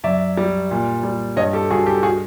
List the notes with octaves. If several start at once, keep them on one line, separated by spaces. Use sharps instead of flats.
F#2 D5 E5
G3
A#2
G3
G2 C#5 D#5
G4 A4
G2 F#4 G#4
G4 A4
F#4 G#4